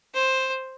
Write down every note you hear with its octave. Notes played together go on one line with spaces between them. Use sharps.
C5